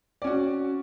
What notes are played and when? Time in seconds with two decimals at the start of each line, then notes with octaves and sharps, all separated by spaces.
0.22 D5
0.24 C#4
0.27 F#4